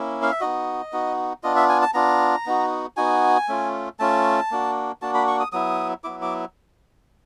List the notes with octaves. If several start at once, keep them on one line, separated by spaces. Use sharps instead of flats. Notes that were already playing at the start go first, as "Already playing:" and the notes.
Already playing: A#3 C#4 E4
F5
E5
B3 D#4 F#4 D#5
B3 D#4 F#4
B3 D4 F4 D#5
E5
G#5
A5
B3 D4 F4 A#5
B3 D#4 F#4
B3 D#4 F#4 G#5
A3 C#4 F4
A3 C#4 F4 A5
A#3 D4 F#4
A#3 D4 F#4 A5
B5
C#6
D#6
F#3 B3 E4 D#6
F#3 B3 E4 D6
D6